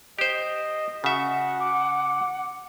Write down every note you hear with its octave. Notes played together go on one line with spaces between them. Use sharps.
G4 C5 D#5
C#3 F#4 E5 F#5
D6